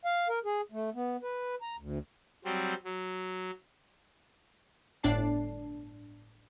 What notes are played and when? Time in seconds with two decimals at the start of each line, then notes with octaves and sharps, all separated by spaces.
0.05 F5
0.29 A#4
0.45 G#4
0.72 A3
0.95 B3
1.23 B4
1.62 A#5
1.78 D2
2.45 F#3 G3 C4
2.85 F#3
5.03 G1 A2 D4 D5 A5 C7